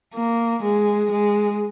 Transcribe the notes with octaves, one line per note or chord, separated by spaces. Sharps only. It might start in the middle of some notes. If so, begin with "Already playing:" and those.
A#3
G#3
G#3